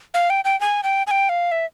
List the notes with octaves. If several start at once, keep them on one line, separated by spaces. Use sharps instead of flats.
F5
G5
G5
G#5
G5
G#5
G5
F5
E5